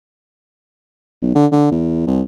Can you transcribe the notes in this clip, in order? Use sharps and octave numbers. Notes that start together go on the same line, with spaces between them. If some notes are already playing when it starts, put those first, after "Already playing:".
B1
D3
D3
E2
C2